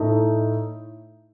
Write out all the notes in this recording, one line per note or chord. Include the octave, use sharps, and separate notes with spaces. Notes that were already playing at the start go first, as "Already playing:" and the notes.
Already playing: A2 A3 D#4